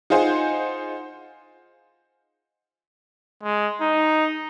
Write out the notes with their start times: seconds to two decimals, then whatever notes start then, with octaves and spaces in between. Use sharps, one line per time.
0.10 D#4 F4 G#4 C5 F#5 G#5
3.43 G#3
3.81 D#4